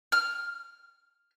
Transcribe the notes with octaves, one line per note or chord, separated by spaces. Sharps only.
F6